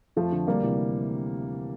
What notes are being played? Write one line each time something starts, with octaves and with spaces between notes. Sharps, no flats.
F2 F3 A3
D3
D2 G3 A#3
C3 E3